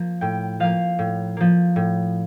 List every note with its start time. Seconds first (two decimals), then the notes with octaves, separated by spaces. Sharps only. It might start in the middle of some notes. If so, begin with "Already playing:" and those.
Already playing: F3 A#3
0.21 A2 G5
0.60 F3 A#3 F5
0.99 A2
1.37 F3 A#3
1.76 A2